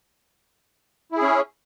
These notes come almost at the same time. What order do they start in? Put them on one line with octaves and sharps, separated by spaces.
E4 G#4 C#4